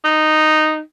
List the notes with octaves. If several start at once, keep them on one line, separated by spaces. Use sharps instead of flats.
D#4